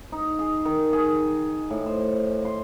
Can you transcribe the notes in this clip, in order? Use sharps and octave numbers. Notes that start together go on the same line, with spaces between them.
D#4
G#4
D#3
G#4
A2
C5
C6